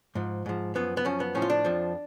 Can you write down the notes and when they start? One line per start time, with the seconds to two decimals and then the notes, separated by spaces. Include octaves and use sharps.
0.15 G#2 F3
0.46 G#2 F3
0.75 F#2 F3 B3
0.97 B3
1.05 F#2 F3 C#4
1.20 B3
1.35 A2 F3 C#4
1.42 F4
1.50 D4
1.65 F2 F3